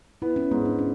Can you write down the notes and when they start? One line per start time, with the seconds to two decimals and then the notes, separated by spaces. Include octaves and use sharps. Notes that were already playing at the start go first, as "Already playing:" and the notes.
0.22 B3 E4
0.36 C#4
0.51 G#2 B3
0.65 D4
0.79 C#4